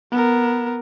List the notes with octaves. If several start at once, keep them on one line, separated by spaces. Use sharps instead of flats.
B3 A#4